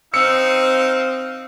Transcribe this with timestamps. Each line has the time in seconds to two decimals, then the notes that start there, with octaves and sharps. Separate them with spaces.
0.14 C4 D#4 F5 E6 C#7